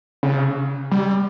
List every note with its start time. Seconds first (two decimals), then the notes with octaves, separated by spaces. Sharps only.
0.23 C#3
0.91 G3